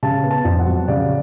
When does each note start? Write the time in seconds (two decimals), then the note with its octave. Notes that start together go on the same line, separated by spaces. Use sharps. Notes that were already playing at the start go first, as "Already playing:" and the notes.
0.03 C#3 A5
0.23 B3
0.31 A5
0.45 F2
0.60 F#5
0.66 F#3
0.88 C#3 D5